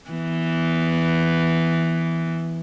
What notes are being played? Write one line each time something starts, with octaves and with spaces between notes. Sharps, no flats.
E3 B3